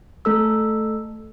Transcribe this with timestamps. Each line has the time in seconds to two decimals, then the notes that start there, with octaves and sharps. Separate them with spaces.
0.25 A3 A4 E6